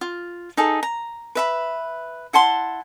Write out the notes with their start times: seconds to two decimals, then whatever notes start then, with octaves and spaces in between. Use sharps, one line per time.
0.01 F4
0.57 D#4 G#4 A4
0.83 A#5
1.35 B4 E5 B5
2.33 E4 F#5 A5 C6